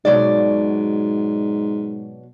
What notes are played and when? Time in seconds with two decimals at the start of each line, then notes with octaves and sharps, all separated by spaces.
0.05 G#2 B2 F#3 D5